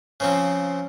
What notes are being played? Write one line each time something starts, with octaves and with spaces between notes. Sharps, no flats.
C#3 F3 C4